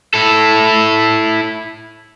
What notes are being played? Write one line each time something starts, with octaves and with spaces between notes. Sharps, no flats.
E4 A4